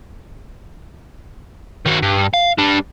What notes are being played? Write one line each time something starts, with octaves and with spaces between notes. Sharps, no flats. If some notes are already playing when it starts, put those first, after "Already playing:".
D#3 F#4
G2
F5
G3 D4